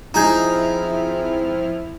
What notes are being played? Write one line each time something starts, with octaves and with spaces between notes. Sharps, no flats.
F3 C4 D#4 E4 G#4 A#5 F6 G6